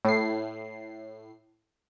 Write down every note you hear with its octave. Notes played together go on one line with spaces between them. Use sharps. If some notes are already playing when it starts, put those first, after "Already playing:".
A2 C7